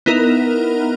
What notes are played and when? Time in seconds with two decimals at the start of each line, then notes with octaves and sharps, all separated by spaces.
0.06 B3 D#4 E4 A#4